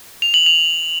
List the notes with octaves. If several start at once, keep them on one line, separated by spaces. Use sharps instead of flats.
F7
F#7
F7